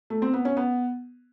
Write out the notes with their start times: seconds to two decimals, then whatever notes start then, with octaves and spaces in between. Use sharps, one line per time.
0.10 A3
0.22 C4
0.33 B3
0.45 C#4
0.57 B3